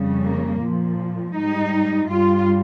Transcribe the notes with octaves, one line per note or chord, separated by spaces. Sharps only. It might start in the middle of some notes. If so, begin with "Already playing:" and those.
Already playing: F2 C#3 G3
A#3
A#2 F3
G#2 G3 D#4
G2 G3 F4